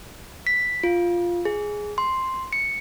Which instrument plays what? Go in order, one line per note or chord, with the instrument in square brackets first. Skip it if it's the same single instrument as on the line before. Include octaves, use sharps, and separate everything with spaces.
[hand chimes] B6
F4
G#4
C6
C#7